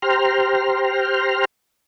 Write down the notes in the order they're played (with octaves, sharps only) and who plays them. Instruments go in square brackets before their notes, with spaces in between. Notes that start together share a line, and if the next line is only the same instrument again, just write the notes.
[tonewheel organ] G4 C5 G5 A#5 C6 F6